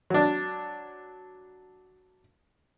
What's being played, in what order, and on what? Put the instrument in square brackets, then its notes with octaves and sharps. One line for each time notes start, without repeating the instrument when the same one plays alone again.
[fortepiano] F#3 D4